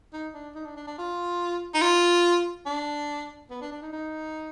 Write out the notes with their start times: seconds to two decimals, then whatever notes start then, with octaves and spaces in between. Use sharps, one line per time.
0.13 D#4
0.34 D4
0.55 D#4
0.66 D4
0.76 D4
0.87 D4
0.98 F4
1.74 D#4
1.81 F4
2.66 D4
3.50 B3
3.61 D4
3.72 D4
3.82 D#4
3.93 D#4